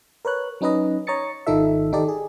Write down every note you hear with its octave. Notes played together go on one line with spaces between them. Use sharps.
A#4 B4 C#5 F#6
F#3 C#4 D#4 B4 D#5
C#5 A#5 D#6 A6 C#7
G#1 D#3 D#4 F4 A4 E5
D#3 D#4 G4 A4 D5
G#4